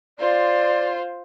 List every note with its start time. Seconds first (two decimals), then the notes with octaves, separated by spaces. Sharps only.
0.19 F4 C5 D5